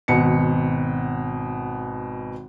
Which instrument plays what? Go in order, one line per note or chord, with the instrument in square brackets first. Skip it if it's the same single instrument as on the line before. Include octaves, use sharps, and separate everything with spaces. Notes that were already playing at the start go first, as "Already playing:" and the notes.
[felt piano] G#1 B2 C#7